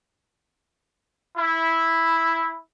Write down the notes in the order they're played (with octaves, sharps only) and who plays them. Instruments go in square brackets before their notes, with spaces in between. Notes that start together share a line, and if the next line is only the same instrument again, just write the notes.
[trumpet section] E4